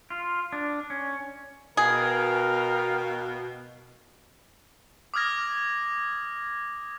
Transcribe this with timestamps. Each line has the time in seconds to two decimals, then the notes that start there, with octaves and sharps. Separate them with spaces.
0.10 F4
0.53 D4
0.90 C#4
1.77 B2 G#4 A#4 F5 G5
5.14 D6 D#6 F6 G#6 A#6